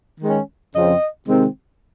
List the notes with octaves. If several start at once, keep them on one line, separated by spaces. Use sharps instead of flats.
D#3 G#3 C#4
F2 C#3 F3 C4 D#5
C3 D#3 G#3 C4